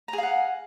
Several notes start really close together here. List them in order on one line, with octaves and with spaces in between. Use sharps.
A#5 G#4 F5 F#5